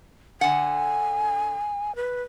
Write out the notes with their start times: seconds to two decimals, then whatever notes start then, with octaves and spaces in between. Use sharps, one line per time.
0.41 D3 F#5 G#5
1.96 B4